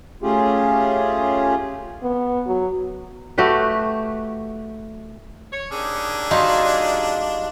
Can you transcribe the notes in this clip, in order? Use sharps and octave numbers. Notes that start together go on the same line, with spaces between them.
A3 C#4 F4 G4 G#4
B3
F#3
A3 F#4 G4 B4
C#5
D#2 C#4 D4 G#4
G3 D#4 F4 F#4 D#5 F5